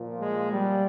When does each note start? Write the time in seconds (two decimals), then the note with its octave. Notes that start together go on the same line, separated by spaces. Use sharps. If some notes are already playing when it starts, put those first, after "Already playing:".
Already playing: A#2 F3
0.19 G#3
0.51 G3